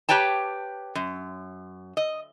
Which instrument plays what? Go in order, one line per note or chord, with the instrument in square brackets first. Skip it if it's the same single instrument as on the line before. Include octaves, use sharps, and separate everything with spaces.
[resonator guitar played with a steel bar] G4 B4 C#5 G5 A5
F#2
D#5